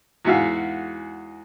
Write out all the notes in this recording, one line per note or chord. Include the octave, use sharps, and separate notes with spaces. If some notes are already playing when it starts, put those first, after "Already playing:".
E2 G#2 F#4 E5 F5